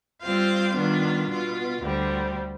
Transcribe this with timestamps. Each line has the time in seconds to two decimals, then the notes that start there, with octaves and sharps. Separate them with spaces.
0.22 G3 C4 F4 C5 F5
0.75 D#3 G3 B3 D4 F4
1.29 B2 B3 F4
1.82 D2 D3 G3 C4